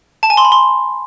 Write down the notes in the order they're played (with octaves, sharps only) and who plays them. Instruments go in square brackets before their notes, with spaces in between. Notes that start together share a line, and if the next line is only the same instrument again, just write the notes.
[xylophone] A5
G#5
C6
B5
C6